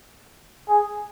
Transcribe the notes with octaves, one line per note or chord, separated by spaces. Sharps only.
G#4